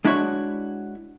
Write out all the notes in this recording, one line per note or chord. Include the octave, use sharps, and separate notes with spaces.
G#3 D4 E4 F#4 C#5